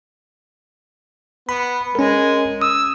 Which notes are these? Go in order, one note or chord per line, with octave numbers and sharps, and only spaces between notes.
B3 B5
G#3 C#4 A#4
D#6 E6